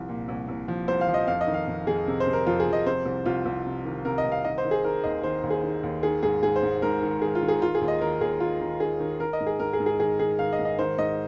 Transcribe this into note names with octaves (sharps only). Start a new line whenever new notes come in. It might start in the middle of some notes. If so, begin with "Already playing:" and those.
Already playing: C2 F3
A#2
C2
C2
F3
C2 C5
F5
F3
D#5
F2 F5
D#5
D#3
F5
F2
F2 G#4
C3
C5
C3
A#4
F2 F4
G#4
F2
D#5
C3 C5
C2
C2 F4
C2
C3
D#3
C3 A#4
D#5
C2
F5
D#3 D#5
C5
D#3
G#4
D#3 A#4
D#2 D#5
D#3 C5
D#2
G#4
D#3
D#2
D#3 G#4
G#2 G#4
G#2 G#4
C5
G#2
G#2 A#4
D#3
D#3 G#4
F4
D#3
G#4
D#3 F4
G#4
D#2
D#5
D#3 A#4
D#2 G#4
D#3 F4
D#3
D#3 G#4
D#3
D#3 A#4
D#5
G#2
G#4
G#2 A#4
G#4
G#2
G#4
D#3 G#4
D#3 G#4
D#3 F5
D#5
G#2
D#5
D#3 C5
G#2 D#5